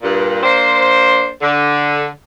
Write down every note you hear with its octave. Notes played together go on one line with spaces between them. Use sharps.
G2 A#2
A#3 D4 C5
D3